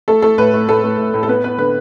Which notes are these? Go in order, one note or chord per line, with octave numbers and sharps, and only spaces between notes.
A3 A4
A3 A4
A2 B4
A3
A2 A4
A3
A2
A2
A4
B3 B4
B3 B4
D3 B4